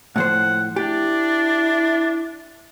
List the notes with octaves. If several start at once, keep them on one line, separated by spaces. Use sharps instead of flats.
A2 F3 C5 F#5
D4 E4 G4